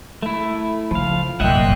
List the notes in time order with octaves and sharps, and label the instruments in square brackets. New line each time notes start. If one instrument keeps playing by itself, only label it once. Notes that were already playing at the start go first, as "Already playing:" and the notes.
[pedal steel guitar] A3 E4
[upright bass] C#3 [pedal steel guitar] F3 F5
[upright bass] F1 F#2 [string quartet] A#2 G5 F#6 [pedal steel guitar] D#5 E5 F#5